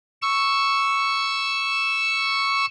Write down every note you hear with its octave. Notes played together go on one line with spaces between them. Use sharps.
C#6 E6